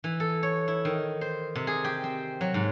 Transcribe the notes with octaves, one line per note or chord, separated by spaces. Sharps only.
E3
A4
C#5
E4
D#3
C5
C3
G#4
G4
C4
F#3
G#2